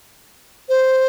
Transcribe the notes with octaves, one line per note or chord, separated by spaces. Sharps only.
C5